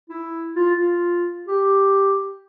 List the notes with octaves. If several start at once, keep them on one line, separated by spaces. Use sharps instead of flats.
E4
F4
F4
G4